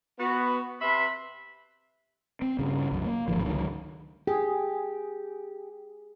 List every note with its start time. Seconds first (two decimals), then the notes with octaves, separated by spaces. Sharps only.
0.20 B3 F#4 B4
0.81 C3 B4 E5 B5 C6
2.42 C4
2.59 G2 C#3
2.91 C2 F#2
3.05 A#3
3.28 D1 G#1 D3 F3
3.44 C#2 D3 D#3 F#3
4.27 G4 G#4